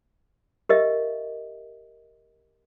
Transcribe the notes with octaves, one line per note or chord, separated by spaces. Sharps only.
G4 A#4 D#5 E5